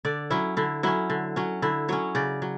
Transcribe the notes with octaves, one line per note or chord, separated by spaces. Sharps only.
D3 D5
F#3 C#4 E4
D3 E4
F#3 C#4 E4
D3
F#3 C#4
D3 E4
F#3 C#4 C#5
C#3 D5
F#3